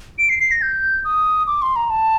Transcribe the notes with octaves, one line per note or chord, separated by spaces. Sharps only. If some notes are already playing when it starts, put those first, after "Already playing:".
D7
C7
C7
A#6
G6
D#6
D6
C6
A#5
A5